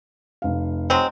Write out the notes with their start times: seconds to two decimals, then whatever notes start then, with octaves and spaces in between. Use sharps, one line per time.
0.42 F1 F5
0.90 F#3 G#3 C4